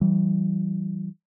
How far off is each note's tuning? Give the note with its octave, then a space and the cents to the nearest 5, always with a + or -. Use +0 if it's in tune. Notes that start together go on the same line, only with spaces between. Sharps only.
E3 +0 G3 -35